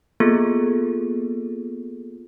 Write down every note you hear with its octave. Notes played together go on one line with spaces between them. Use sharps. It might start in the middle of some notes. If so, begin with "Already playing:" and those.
A#3 B3 F4 G#4 A4